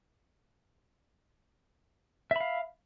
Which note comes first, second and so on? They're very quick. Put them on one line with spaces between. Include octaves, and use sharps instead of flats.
E5 B5 F5